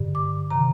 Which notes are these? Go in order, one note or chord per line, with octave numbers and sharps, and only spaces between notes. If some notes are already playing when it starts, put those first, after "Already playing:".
Already playing: G2 D3
D6
C3 D#3 A#5